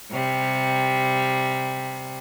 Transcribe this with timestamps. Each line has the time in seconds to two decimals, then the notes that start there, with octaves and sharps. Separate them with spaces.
0.11 C3 G3